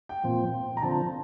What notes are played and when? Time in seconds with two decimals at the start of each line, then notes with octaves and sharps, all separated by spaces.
0.09 G5
0.24 A#2 F3 C4
0.77 A#5
0.82 D3 F3 C4 A5